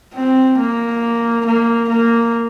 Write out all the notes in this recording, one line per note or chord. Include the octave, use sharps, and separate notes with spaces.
C4
A#3
A#3
A#3